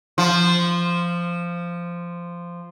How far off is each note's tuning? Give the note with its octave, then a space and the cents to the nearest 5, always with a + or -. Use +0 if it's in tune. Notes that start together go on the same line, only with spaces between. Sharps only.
F3 -10